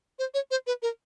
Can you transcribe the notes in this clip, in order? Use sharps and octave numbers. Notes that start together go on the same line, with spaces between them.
C5
C#5
C5
B4
A#4